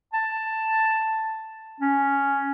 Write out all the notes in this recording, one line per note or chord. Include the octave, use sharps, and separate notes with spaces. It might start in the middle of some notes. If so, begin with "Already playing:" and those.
A5
C#4